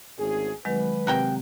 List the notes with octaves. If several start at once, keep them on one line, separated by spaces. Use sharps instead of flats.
G#1 D2 C#4 G#4
C2 D#3 F#3 G#3 B4
C3 F#4 A#4 G5